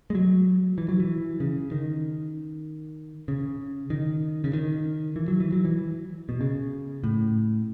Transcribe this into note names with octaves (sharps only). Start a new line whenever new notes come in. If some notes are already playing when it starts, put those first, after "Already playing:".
G#3
F#3
E3
F#3
E3
C#3
D#3
C#3
D#3
C#3
D#3
E3
F#3
E3
F#3
E3
B2
C#3
A2